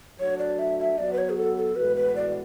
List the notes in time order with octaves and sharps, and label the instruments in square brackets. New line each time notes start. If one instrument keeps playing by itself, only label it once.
[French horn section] F#3 A3 D4 F#4 [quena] C#5
[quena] D5
E5
E5
[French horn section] F#3 B3 F#4 [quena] D5
[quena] B4
C#5
G#4
A4
A4
[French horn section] A2 E3 G#3 B3 F#4 [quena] B4
[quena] B4
D5